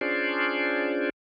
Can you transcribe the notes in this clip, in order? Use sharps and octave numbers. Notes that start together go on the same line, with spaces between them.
C#4 D4 F4 G#4 C5 D5